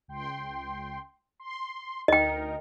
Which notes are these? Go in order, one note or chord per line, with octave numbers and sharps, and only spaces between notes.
C#2 G5 C6
C6
D2 D#4 A#4 D#5 G5